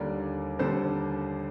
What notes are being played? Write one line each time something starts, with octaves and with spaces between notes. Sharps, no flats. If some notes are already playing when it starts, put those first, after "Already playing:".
Already playing: D#2 D3 G3 A#4 D5
D#2 D3 G3 A4 C5